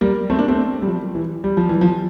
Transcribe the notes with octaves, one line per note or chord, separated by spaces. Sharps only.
G3 A#3
A3 C4
A#3 D4
A3 C4
G3
F3
E3
G3
F3
E3
F3